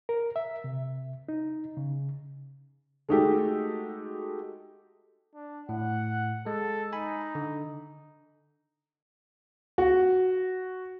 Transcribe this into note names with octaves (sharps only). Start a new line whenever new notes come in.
A#4
E5
C3
D#4
C#3
G#3 A3 D#4 F#4 G4 A4
D4
A2 F#5
G#3 A4
D#4 G#5 B5
D3
F#4